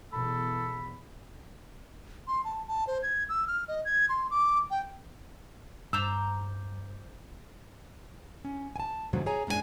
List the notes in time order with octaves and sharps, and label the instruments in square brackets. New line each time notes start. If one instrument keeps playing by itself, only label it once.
[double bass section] E2 B2 [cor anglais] A4 [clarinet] B5
[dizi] C6
A5
A5
C5
G#6
E6
F6
D#5
G#6
C6
D6
G5
[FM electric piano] G2 [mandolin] C5 A#5 D6 [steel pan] E6
[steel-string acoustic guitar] C#4
G#5 A5
G#2 B2 D3 F3 F#3
G#4 C#5 G#5 A#5
F#2 G#3 D4 E4 G#5